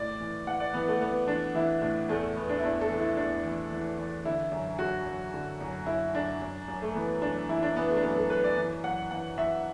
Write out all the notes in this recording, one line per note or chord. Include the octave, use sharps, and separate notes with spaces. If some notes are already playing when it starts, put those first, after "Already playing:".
Already playing: A2 D5
E3
E3 F#5
D5
E3 B3
A3
E3 B3
E3 D4
E3 E4
A2 D4
E2 A3
E2 B3
D4
E4
E2 D4
A4
E3
E4
E2 D4
E3
E3
E3
D3 E4
F#2
F#2 F#4
F#2
D3
F#2
F#2 E4
F#2 D4
F#2
F#2
A3
E3 B3
F#2 D4
E3 E4
D4
E3 B3
A3
D4
F#2 B3
A4
F#2 B4
D5
E3
F#2 F#5
E3 F#5
E3 E5